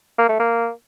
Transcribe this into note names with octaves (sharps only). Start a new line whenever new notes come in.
A#3
A3
A#3